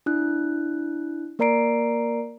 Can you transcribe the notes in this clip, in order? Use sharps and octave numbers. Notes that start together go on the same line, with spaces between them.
D4 E4 F#6
A#3 A#4 D5 A#5 C7 D7